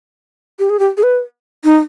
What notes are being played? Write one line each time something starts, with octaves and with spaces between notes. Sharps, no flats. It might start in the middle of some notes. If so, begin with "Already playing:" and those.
G4
G#4
G4
G#4
B4
D#4